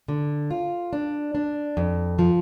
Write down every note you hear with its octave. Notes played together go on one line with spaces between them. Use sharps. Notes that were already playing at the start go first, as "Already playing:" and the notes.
D3
F4
D4
D4
F2
F3